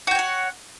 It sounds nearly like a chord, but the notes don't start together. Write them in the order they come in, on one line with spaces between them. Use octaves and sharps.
F#4 G5 C#5 F#5